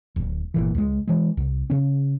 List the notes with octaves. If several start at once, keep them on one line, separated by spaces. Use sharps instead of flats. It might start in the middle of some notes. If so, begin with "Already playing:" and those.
D1
G1 A#2 E3
C#2 G3 G#3
E3 G#3
C2
C#3 C#4